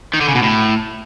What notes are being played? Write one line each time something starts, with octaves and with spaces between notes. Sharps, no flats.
D#3
D3
C#3
B2
A2